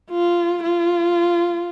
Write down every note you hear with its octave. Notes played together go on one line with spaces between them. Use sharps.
F4
F4